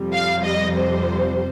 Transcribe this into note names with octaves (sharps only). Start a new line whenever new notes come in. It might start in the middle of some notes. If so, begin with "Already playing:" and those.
Already playing: F2 C3 G3
F5
D#5
C5